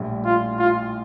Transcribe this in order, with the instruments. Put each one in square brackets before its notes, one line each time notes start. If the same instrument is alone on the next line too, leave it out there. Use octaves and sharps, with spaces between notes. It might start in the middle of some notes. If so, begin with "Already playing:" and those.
Already playing: [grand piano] A#1 A2 G3
[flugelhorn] F4
F4